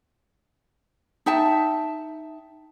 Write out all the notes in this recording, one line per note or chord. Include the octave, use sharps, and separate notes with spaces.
D#4 E5 G5 A5